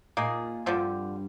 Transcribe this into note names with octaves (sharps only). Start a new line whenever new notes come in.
A#2 A#3 D#4 G#4
G2 D3 F3 C4